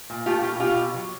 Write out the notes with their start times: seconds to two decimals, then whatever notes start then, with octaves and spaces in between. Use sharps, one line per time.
0.10 A#2
0.26 A3 F4 G4
0.43 B2 F4 G4
0.60 B2 F4 G4
0.77 B2
0.94 F#3